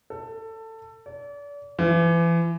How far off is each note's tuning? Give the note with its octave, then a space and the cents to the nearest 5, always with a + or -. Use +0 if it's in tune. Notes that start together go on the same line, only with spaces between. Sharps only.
A4 +20
D5 -35
E3 +35